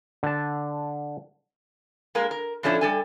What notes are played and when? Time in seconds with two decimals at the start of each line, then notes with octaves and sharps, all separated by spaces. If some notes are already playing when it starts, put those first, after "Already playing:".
0.23 D3 A5
2.15 G#3 A#3 A#4
2.31 A#4
2.63 A2 F3 A3 C#4 D4
2.81 G3 A4 G#5